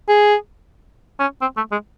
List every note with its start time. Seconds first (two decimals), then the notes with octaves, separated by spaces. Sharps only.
0.08 G#4
1.20 C#4
1.41 C4
1.57 A3
1.72 G#3